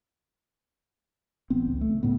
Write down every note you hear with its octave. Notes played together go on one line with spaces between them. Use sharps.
A1 B3 C4
C#2
A3
A2 C#3 B3